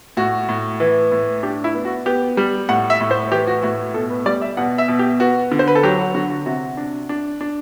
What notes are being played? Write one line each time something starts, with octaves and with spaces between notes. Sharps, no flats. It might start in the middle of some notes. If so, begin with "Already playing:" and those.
A2 F#4
A2
E3
A2
D4 G4
E4
B3
F#4
B3 G4
G3
A2 F#5
E5
A2
C5
E3 G4
F#4
A2 F#4
B2 A4
B4
G3 D5
E5
B2 F#5
E5
B2
G4
B3 F#4
D3
C5
B4
A4
F#3 G4
F#4
D3 F#4
F#4
C3 F#4
D4
D4
D4